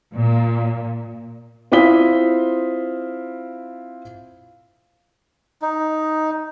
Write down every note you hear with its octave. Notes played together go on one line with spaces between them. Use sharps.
A#2
C4 E4 F4 D#6 B6 G7
D#4